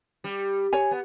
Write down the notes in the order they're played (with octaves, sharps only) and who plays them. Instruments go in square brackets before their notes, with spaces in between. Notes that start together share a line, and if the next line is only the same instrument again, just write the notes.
[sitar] G3
[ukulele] C#5 G#5
[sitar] B3